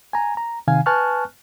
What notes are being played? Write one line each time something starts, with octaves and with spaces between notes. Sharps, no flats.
G#5 A#5
A#5
C3 D#3 F5 G#5
B4 G#5 A5 C#6 F6 F#6